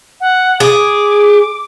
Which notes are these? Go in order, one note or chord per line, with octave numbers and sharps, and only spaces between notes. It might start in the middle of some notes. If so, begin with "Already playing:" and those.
F#5
G#4 D6